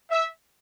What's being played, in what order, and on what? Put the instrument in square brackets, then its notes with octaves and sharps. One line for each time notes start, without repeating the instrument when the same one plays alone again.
[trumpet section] E5